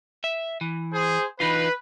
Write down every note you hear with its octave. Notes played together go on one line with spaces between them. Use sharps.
E5
E3
G#4 C5
E3 D#4 F4 B4